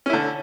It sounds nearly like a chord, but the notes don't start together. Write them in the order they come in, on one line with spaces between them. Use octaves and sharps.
C#4 E4 D3